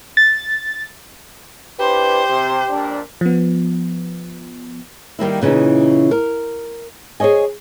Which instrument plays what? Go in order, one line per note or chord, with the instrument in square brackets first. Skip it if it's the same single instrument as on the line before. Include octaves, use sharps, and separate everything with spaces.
[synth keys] A6
[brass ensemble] D4 E4 B4 [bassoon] G4 [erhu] C5
[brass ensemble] C3
F2 A#2 D4
[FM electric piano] F3 B3
[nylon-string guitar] D#3 G3 A#3 E4
A#2 C#3 E3 C#4 D#4
A#4
G#4 C5 C#5 D#5 G#5